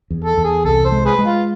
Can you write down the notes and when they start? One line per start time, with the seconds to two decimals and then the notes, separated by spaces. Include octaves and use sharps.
0.10 E2
0.24 A4
0.37 E2
0.44 G#4
0.65 C2 A4
0.85 C5
0.92 G#3
1.06 G#4 B4
1.19 G#3
1.25 F4